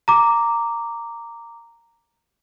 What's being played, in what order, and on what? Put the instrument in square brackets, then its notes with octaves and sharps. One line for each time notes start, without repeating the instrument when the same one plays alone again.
[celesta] A#5 D6